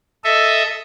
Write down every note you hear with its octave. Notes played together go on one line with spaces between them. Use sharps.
A4 D#5 E5